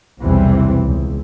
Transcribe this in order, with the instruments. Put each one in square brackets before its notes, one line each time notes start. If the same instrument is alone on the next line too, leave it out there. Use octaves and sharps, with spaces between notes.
[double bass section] B1 E2 C3 E3 G3 C4
C#2